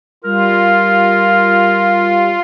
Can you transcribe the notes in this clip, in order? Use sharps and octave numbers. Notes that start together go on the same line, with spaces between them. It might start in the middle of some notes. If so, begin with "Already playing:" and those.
G3 F4 A#4